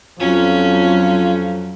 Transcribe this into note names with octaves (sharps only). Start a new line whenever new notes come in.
F2 F#3 C#4 F4